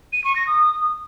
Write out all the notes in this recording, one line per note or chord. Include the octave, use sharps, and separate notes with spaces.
D#7
C#6
A#6
D#6